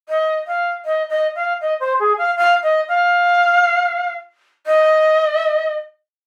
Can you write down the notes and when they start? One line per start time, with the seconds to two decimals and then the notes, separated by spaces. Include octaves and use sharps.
0.09 D#5
0.47 F5
0.85 D#5
1.10 D#5
1.36 F5
1.61 D#5
1.80 C5
2.00 G#4
2.18 F5
2.37 F5
2.63 D#5
2.88 F5
4.66 D#5